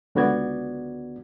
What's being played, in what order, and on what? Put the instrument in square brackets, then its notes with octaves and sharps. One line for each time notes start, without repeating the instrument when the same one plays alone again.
[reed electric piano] C#2 D3 B3 F#4 D5 G#6